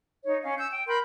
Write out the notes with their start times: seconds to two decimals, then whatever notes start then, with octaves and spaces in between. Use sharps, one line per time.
0.24 D#4 C#5
0.43 C#4 F5
0.57 E6 G6
0.72 G5
0.88 A#4 B5 C6 G6